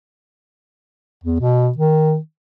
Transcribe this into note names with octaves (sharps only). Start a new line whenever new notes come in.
E2
B2
D#3